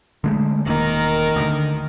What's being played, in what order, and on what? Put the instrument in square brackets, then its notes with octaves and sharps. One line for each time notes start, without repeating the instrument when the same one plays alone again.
[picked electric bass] D3 G#3 A3
[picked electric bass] E1 A#3 [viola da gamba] D#3 [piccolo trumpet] A#4
[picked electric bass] D2 D3